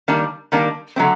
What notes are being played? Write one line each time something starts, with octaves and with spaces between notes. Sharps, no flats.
D#3 G3 A#3 D4
D#3 G3 A#3 D4
D3 F#3 A3 C4